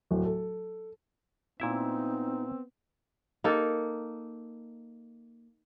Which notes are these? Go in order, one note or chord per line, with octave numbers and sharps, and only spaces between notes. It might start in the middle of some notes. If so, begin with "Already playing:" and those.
D1
A4
A#2 B3 C4 D#4 E4 E5
A#3 D#4 A4